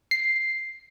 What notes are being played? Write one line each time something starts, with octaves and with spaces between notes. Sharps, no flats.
C7